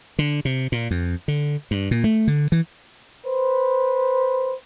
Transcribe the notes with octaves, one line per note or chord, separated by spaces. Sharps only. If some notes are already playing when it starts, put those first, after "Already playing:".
D3
C3
A#2
F2
D3
G2
A#2
A3
D3
E3
B4 C5